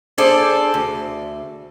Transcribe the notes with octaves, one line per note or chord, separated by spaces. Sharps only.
D4 G#4 A4 C5 D5
D2